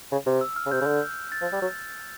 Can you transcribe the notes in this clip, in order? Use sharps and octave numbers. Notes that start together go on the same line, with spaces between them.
C#3
C3
E6
F6
C#3
C3 G6
C#3
D3
A6
F3
G3
F#3